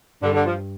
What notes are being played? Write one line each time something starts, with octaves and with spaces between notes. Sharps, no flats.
G2 D3 G3
D3
F3